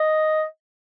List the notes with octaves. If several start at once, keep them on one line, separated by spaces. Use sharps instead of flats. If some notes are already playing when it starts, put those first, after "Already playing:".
Already playing: D#5